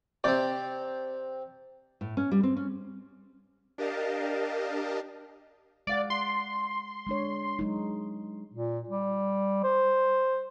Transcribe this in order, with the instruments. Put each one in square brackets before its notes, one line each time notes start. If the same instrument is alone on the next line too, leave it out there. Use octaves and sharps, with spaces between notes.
[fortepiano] C3 D5 [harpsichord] C4 G4
[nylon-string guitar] A2
C#4
G3
C4
C#4
[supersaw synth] D4 G4 A#4 D#5 F5 A5
[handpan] G#3 F5 F#5 [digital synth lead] D5
[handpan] F#5 [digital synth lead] C6
[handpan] G#3 D4 C#5
F#3 G#3 D#4
[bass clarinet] A#2
G3
C5